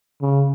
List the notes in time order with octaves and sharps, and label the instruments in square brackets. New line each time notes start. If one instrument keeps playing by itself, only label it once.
[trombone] C#3